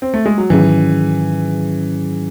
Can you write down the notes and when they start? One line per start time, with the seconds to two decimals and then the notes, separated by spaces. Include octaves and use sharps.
0.02 C4
0.14 A3
0.26 G#3
0.38 F#3
0.50 G#2 D#3 E3 F#3 C#4 G#4